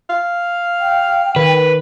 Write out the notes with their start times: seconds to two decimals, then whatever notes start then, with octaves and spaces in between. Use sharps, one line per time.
0.10 F5
0.80 G5
1.36 D#3 B4